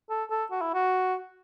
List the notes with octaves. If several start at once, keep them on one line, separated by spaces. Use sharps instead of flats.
A4
A4
F#4
E4
F#4